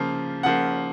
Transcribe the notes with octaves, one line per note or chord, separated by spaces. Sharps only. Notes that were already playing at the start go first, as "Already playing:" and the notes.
Already playing: C#3 F3 A#3
C#3 F3 A#3 F#5